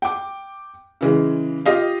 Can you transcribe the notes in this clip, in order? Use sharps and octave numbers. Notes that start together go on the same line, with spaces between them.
G5 D6
C#3 E3 G#3
F4 G4 D#5 F5